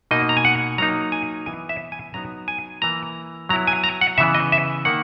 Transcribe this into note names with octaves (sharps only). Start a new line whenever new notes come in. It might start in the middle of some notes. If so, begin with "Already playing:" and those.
B2 A#3 D#4 D#5
A#5
G#5
F#5
F#3 A#3 D#4 A#5
G#5
E3 B3 E4 G#5
E5
G#5
F#3 B3 D#4 A#5
G#5
E3 A#3 E4 A#5
F#3 B3 E4 A#5
G#5
A#5
F#5
C#3 E3 B3 E5
D#5
E5
D#3 A#3 D#4 F#5